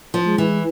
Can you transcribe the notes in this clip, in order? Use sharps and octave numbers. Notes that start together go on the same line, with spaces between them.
F3
G#3
E3